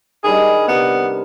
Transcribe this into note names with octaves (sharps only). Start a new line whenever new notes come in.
D#3 G3 D4 G#4
C3 B3